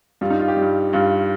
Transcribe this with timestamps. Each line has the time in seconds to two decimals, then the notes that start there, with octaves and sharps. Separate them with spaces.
0.21 G2 G3 F4
0.30 D#4
0.39 F4
0.48 G4
0.57 G2 G3
0.93 G2 G3 F4